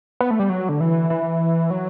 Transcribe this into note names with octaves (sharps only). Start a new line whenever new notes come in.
B3
A3
G3
F#3
D3
E3
E3
F#3